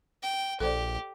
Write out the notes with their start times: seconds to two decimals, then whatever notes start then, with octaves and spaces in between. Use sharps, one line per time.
0.23 G5
0.60 A#1 G4 A4 C5 D5